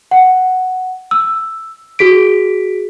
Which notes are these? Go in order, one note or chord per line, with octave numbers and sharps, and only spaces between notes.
F#5
E6
F#4 G#4 B6 D7